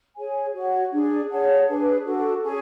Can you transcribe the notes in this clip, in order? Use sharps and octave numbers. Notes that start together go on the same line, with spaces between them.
G#4 C#5 G#5
F#4 C#5 F#5
D4 G#4 D5
G#4 C#5 F#5 A5
D4 G#4 B4
D4 F#4 A4
C#4 G#4 C#5 G#5